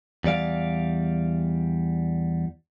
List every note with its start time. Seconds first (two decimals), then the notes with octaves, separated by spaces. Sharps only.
0.24 E2 G3 D5 F5